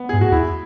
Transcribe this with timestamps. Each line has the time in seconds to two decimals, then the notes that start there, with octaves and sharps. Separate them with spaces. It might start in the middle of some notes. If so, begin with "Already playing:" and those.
Already playing: B3
0.09 G#2 G#4
0.21 F#4
0.32 E2 E4